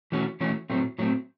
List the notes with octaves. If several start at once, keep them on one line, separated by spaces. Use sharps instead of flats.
E3 A3 C#4 F#4
E3 A3 C#4 F#4
A2 F#3 A3 C4
A2 F#3 A3 C4